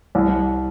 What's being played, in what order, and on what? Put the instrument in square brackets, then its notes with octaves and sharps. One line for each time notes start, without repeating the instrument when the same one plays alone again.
[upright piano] C2